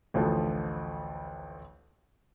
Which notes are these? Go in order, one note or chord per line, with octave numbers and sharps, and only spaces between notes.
A1 D2 F3 A4